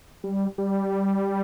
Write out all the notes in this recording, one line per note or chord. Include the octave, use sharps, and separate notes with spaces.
G3
G3